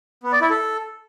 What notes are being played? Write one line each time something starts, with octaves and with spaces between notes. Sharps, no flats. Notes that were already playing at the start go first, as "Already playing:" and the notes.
B3
D5
E4
A4